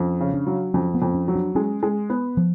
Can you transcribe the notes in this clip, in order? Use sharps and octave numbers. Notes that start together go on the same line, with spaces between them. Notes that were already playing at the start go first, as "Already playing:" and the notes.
Already playing: F2 C#4
C#3
D4
F#3
F2 C#4
B3
F2
C#4
F#3
D4
G#3 C#4
G#3
B3
F3